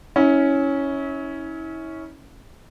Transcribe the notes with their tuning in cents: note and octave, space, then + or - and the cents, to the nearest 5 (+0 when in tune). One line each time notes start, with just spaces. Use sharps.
C#4 +0 E4 -35